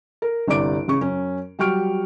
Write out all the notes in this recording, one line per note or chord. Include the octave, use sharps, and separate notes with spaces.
A#4
G1 C2 G4 D5 D6 D7
A1 C#3 C#6
F#2 C#4
F#3 G3 G5 C#6 F6 D7